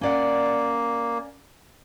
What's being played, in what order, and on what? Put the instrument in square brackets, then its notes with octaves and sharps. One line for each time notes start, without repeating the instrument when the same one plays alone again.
[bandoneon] A#3 [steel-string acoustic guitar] C#4 D5 F#5